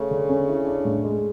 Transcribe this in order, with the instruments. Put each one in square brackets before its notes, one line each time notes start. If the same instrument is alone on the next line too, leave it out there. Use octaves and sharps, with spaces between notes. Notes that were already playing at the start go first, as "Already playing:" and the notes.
Already playing: [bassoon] C#3 [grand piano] A3
[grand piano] D3
C#4
E4
D4
A2
G#3